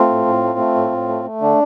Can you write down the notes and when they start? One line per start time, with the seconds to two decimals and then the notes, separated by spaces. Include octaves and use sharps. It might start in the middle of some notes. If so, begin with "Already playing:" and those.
Already playing: A3 C4 F4
0.09 A2
0.26 A2
0.43 A3
0.59 A3
0.75 A2
0.91 A2
1.08 A3
1.25 A3
1.41 D3 D4